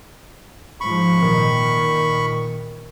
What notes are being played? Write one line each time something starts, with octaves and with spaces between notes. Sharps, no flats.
G#2 F3 B5 C#6
A#2 D#3